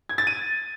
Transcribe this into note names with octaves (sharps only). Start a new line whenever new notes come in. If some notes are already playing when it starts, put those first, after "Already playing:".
G#6
A6
D#7